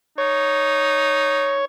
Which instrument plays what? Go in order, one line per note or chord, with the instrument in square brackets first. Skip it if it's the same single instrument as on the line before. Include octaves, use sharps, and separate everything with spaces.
[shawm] D#4 [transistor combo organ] C#5